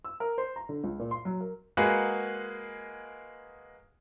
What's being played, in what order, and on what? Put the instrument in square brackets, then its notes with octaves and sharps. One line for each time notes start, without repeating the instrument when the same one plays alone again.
[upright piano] E6
A#4
C5
A#5
D3
C#2
A#2
C6
F#3
A#4
[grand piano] G#3 A#3 F#4 G#4 B4 F#5